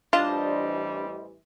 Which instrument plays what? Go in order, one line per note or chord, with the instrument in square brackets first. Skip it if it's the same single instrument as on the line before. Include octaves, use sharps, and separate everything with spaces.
[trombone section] A1 E3 G3 [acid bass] D4 [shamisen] F4 [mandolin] C5 D#5 A5